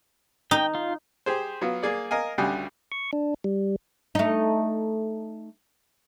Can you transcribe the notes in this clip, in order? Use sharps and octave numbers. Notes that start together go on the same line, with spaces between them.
D#4 G5
F4
G4 G#4 C5
F#3 B3 F4
A#3 G#4 D5
A#4 D#5 F5 G#5
D2 C#3 G3 F#4 G4 G#5
C#6
D4
G3
A3 D#4